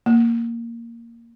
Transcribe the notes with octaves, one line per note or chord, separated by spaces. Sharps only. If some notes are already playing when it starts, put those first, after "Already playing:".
A#3